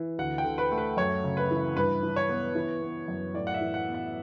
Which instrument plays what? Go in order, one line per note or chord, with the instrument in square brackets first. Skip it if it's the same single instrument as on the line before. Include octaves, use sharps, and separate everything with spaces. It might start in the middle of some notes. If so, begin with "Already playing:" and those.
Already playing: [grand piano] E3
D2 F#5
G5
D3
B4
A3
B4
F#2 C#5
C#3
B4
E3
G2 B4
E3
C#5
B3
E3
B3
F#2
A2 D5
F#5
E5
E3
F#5
B3
F#5